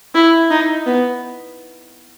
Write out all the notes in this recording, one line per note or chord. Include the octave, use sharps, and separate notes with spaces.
E4
D#4
B3